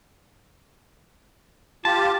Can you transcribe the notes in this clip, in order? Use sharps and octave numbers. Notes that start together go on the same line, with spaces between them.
F4 G4 A5